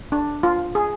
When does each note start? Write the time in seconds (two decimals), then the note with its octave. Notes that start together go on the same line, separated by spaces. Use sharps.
0.12 D4
0.43 F4
0.75 G#4